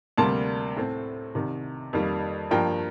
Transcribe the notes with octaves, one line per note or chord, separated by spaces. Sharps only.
D2 C3 G3 A#3 A5 C6
A2 A3 C4
C2 C3 D#3
F2 D#3 G3 A#3
G2 F3 A#3 G5 A#5